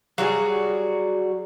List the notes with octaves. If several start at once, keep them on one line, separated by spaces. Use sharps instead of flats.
F#3 G3 F#4 G#4